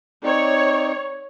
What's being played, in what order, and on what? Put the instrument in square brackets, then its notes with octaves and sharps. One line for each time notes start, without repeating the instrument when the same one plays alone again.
[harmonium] C4 D#4 D5 [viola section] C#5